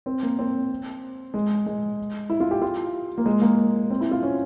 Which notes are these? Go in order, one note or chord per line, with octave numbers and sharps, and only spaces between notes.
C4
A#3
C4
G#3
G#3
E4
F4
G4
F4
A#3
G#3
A#3
C4
E4
F4
C#4